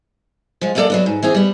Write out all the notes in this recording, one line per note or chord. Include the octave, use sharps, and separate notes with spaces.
F3 G#3
F#2 A#3 D4 D#4 A4 D5
F#3 B3 D4
G#2
E3 C4 G#4
G3 B3